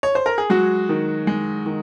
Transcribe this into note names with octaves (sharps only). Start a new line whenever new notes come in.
C#5
C5
A#4
G#4
F#3 G#3 F#4
D#3
G#3
D#3